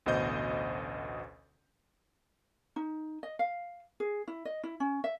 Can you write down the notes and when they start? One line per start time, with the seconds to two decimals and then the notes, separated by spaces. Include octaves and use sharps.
0.06 A1 D2 B2 C5 D#5 G6
2.76 D#4
3.23 D#5
3.39 F5
4.00 G#4
4.28 E4
4.45 D#5
4.63 E4
4.80 C#4
5.04 E5